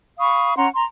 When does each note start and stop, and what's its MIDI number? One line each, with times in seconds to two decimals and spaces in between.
0.19 0.54 77
0.19 0.54 83
0.19 0.54 85
0.19 0.54 87
0.57 0.67 61
0.57 0.67 78
0.57 0.67 82
0.57 0.67 84
0.74 0.84 82
0.74 0.84 84